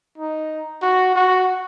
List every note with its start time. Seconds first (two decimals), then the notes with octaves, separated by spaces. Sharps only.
0.18 D#4
0.82 F#4
1.15 F#4